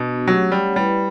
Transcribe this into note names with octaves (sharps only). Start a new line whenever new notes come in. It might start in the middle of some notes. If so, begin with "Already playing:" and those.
Already playing: B2 B3 D4 F#4
F#3 A3 C#4 G4 C#5 F#5
G3
G3 E4 B4 D5